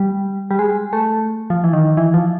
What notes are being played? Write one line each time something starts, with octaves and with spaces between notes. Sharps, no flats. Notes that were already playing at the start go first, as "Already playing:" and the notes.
Already playing: G3
G3
G#3
A3
F3
E3
D#3
E3
F3